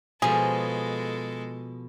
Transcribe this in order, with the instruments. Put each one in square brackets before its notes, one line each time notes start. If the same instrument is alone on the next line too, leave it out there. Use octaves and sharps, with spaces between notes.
[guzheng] B2 F3 [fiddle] G#3 A4 [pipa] G#4